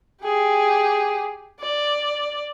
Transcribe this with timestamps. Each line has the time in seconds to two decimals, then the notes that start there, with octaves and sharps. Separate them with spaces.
0.23 G4 G#4
1.60 D5